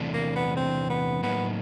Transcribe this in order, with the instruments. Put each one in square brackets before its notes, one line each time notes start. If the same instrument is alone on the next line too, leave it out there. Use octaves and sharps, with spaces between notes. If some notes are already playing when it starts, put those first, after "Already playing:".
Already playing: [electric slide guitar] E2 C3 E3 A3 D4
[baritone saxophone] A#3
B3
C4
B3
[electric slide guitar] A2 F#3 A#3 D#4 [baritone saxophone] B3